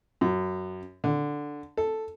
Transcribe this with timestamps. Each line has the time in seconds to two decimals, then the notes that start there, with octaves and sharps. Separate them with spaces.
0.21 F#2
1.04 D3
1.77 A4